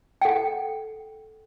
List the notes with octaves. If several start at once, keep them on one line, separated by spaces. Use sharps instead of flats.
A4 F#5 G5